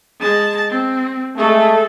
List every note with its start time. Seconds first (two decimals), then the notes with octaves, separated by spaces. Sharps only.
0.20 G#3 A5
0.69 C4
1.37 G#3 A3 A4